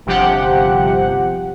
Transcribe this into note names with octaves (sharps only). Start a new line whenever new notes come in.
G1 C3 F3 G4 F#5